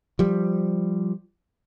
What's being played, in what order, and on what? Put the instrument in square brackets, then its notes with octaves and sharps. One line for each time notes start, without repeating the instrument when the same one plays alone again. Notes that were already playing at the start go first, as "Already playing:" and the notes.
[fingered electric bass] F3 G3